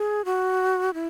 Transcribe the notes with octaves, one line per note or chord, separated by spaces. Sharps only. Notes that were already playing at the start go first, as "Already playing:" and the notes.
Already playing: G#4
F#4
E4